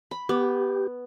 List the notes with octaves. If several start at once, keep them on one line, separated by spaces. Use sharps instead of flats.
B5
B3 G4